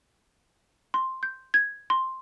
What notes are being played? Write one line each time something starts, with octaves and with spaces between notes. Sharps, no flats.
C6
G6
G#6
C6